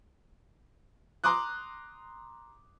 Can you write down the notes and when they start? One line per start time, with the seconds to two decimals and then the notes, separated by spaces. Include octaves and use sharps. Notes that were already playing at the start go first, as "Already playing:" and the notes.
1.24 A#5 C6 D6 D#6 F#6